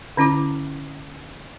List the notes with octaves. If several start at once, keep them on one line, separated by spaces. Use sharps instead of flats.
D3 C#4 E4 D6